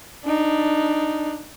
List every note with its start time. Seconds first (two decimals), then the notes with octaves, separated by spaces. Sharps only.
0.24 D4 D#4